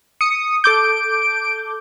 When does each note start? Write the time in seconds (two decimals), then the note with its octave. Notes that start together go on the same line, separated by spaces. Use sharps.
0.21 D#6 C#7
0.64 A4 D6 G6 D7